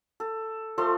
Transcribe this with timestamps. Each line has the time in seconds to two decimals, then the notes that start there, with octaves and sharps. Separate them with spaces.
0.20 A4
0.78 F3 A3 A4 C6